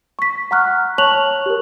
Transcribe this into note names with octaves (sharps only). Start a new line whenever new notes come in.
C#6 B6
F#5 A#5 C#6 F6 F#6
C#5 A5 C#6 F#6 F7 F#7
G4 A#4